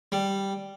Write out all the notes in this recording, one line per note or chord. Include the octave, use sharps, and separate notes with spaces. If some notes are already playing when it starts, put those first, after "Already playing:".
G3